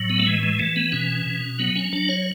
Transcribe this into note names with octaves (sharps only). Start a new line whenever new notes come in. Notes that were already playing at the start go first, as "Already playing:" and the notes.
Already playing: A2 F#3
B3
A3
E3 G#3
G#3
E3 A3
B3
B2 C#4
B2
F#3 B3
C#4
F#3 D4
C#5